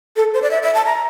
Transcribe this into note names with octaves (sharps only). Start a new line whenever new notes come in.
A4
C5
D5
E5
E5
A5
A#5